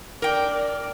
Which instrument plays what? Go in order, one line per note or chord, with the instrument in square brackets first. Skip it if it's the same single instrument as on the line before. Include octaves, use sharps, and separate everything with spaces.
[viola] D4 D5 [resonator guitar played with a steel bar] A#4 G5